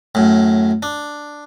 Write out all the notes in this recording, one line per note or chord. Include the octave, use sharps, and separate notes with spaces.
F#2 A2
D4